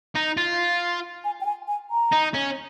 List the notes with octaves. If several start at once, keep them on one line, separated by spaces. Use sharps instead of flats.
D#4
F4
G#5
G5
G#5
G#5
A#5
D#4
C#4